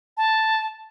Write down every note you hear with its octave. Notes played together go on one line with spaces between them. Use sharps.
A5